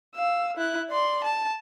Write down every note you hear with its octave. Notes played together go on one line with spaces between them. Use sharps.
F5 E6
E4 F#6
D5 C6
A5